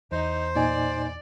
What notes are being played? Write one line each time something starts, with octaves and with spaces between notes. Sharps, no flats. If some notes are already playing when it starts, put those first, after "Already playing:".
E2 D#4 C5
A#2 D#4 D5 G#5